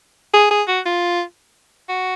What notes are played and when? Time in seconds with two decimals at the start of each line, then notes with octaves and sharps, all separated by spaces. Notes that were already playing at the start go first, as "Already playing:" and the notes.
0.34 G#4
0.51 G#4
0.68 F#4
0.86 F4
1.89 F#4